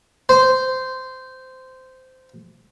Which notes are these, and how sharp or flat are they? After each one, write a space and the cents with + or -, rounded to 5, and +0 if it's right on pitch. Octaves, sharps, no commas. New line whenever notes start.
C5 -15